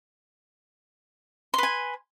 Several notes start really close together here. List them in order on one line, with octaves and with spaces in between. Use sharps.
C6 B4 G#5